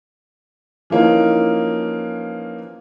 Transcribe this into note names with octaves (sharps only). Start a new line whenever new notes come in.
E3 F3 A#3 C#4 D#4